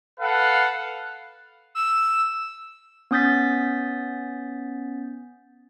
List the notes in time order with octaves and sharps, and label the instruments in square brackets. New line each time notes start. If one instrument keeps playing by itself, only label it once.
[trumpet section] A4 B4 F5 F#5
[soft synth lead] E6
[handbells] B3 C#4 D#6 G6 A6 B6